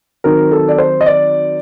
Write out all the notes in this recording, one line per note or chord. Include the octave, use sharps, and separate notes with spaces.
D#3 F#3 C4 D#4 A#4
A4
D5
C5
D#5
D5